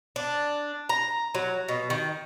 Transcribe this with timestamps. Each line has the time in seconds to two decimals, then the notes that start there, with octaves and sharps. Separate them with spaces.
0.16 D4
0.89 A#5
1.35 F#3
1.69 B2
1.90 D#3